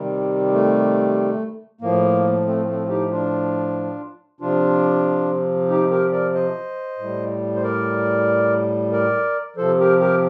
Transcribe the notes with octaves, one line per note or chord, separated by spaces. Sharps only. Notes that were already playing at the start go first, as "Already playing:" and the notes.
Already playing: C3 D#3 G3
A3
A2 F3 A#3
A3 C4
A3 C4
D#4 G4
D4 F4
C3 F3 D4 F4
D#4 G4
G4 A#4
A#4 D5
C5 D#5
A2 G3
C5
A#4 D5
A#4 D5
C3 F3 A4 C5
G4 A#4
G4 A#4